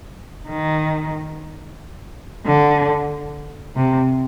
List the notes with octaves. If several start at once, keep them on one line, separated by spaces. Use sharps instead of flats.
D#3
D3
C3